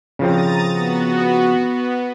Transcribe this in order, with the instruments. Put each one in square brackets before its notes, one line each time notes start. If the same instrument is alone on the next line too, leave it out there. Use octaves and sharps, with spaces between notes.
[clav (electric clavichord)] C#3 F3 C4 [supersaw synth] A#5 D#6 A6
[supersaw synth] B3 F#4
B3